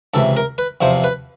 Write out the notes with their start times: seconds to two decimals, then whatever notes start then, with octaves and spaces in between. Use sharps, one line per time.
0.14 C#2 C3 E3 A4
0.37 A#4
0.58 B4
0.81 E2 C3 F3 C5
1.04 B4